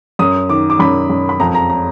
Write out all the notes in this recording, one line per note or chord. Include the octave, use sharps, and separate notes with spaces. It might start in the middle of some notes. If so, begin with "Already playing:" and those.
F#2 D#6
D#3 D6
D6
F#2 B5
F#2
B5
F2 A#5
A#5
A#5